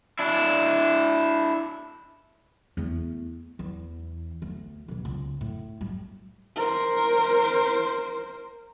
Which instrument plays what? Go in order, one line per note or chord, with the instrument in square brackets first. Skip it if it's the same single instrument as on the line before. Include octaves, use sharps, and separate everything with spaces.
[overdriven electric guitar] D4 E4
[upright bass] E2 A3
E2
D2
E2 B2
C#2
A2
G3
[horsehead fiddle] A#4 C5